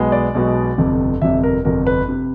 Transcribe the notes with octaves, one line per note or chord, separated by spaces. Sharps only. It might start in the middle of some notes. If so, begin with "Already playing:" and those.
Already playing: B1 B2 G#3 B3
D5
B1 B2 G#3 B3
G1 F2 C3
G1 F2 C3 E5
A#4
G1 F2 C3 A#4
B4
C3